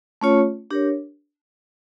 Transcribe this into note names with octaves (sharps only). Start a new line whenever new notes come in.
A3 C#4 F4 C#5
D4 G4 A#4 C#5